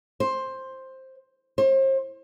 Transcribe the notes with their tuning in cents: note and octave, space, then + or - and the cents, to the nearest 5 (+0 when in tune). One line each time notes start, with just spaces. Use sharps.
C5 +10
C5 +40